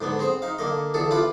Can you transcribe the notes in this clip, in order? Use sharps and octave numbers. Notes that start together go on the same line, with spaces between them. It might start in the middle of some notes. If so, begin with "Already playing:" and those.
G#2 D3 B3
C4 G#4 C5
D#4 F5
D3 A#3 D#5
E2 D3 G#4 A4
E4 F4 G4 B4